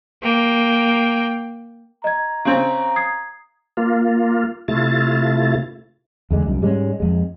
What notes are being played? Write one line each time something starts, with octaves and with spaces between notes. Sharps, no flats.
A#3 G5
D#5 A#5 G#6
C#3 C4
D#6 G#6 C7
A#3 F4
C3 A3 E4 F4 A6
E2 D3 G#3
C2 F#2
G#2 G3 G#3 C#4
F2 G#3